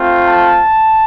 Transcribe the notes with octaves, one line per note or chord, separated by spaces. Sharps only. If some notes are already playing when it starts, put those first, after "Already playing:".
Already playing: A3 C4 F4
A5